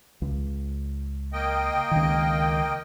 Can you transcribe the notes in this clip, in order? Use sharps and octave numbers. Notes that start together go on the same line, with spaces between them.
C#2
A#3 D#5 G5
C#2 D#3